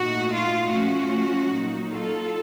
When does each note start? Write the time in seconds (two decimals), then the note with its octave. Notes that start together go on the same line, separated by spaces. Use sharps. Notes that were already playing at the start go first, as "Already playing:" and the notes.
Already playing: A#2 A3 D#4 F#4
0.33 F4
0.72 F3 A3 C#4 F4 F#4
1.52 A#2 F#3 A#3 D#4
1.91 F4 A4